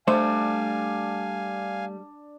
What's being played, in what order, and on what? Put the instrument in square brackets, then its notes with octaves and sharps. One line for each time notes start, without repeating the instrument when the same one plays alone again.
[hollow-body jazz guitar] G3 A3 E5 [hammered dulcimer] D4 [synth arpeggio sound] C5 [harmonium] F5 G#5